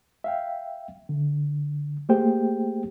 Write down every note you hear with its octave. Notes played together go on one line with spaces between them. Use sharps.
E5 F5 G5
D3
A3 A#3 G4 G#4 C5 G5